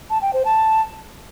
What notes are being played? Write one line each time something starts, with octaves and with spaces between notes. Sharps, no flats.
A5
G5
C5
A5